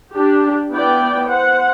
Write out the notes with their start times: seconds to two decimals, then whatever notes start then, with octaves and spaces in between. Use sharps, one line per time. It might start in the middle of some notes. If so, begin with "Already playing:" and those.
0.12 D4 G4
0.71 B3 E4 D5 G5
1.28 C5 F#5